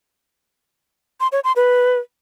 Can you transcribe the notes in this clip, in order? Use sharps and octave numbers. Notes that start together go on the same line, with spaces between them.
C6
C#5
C6
B4